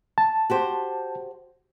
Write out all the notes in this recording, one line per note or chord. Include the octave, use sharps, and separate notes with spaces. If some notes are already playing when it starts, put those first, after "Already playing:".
A5
F#4 G4 C5